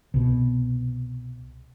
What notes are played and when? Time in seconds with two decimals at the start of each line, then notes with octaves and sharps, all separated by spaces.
0.14 C2 B2